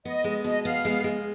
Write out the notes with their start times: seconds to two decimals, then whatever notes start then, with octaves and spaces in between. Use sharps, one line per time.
0.05 B3 D#5
0.24 G#3
0.44 B2 D#5
0.65 B3 F5
0.85 G#3
1.04 G#3